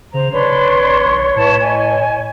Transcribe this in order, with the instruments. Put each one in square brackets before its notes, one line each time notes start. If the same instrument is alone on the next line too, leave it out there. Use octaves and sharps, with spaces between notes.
[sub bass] C#3 [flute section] C5 A#5
[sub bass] D1 [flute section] D4 B4 C6 [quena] C#5
[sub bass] G#1
B1
[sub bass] A2 [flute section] E4 B4 A5
[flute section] D#5 G#5